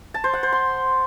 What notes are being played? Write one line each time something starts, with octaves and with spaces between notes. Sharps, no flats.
A5
C5
F#5
C5
C6